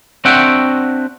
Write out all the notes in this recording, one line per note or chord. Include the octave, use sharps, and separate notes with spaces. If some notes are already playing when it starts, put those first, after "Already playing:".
C4 D4 F#4 E5 F#5 G5